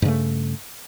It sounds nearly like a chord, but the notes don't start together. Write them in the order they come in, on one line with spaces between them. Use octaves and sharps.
G2 C#3 A3